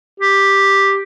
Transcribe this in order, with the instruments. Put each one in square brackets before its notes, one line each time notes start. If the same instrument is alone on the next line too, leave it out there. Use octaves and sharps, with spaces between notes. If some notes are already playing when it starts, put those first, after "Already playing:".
[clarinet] G4